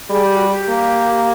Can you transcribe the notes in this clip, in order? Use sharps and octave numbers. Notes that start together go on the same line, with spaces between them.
G3 G#4
G4
F#4
G4
A#3